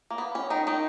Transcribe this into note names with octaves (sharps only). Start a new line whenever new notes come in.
A#3
B3
C#4
D#3 D#4
D#3 D#4